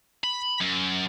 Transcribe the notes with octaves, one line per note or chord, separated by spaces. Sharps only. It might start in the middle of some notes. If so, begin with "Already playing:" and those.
B5
F#2